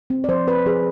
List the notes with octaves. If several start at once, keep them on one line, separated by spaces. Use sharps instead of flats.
C4
D5
F3 C5
C4 B4
F3 G#4